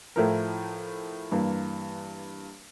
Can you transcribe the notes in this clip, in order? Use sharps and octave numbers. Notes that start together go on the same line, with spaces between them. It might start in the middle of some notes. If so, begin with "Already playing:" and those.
A2 F3 A3 E4 A#4
G2 E3 A#3